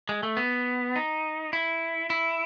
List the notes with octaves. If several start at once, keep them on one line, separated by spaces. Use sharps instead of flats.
G#3
A3
B3
D#4
E4
E4